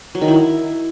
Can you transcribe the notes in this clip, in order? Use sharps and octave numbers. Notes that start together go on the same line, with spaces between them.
F#3
D#3
E4